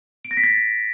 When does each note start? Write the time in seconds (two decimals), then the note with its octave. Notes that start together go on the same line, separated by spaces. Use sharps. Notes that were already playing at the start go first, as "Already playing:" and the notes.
0.25 D7
0.31 A#6
0.37 B6
0.43 A6